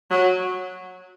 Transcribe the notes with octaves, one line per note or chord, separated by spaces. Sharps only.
F#3